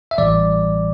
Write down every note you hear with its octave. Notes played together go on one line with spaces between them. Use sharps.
E5
A1 A2 E3 G3 D5